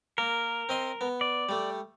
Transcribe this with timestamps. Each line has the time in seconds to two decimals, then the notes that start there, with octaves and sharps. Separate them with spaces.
0.18 A#3 A#4
0.69 C4 D#5 C6
1.01 B3
1.21 D5
1.49 G3 A3